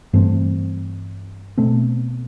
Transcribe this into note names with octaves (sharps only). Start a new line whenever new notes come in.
G2 E3 A3 C4
B2 A3 C4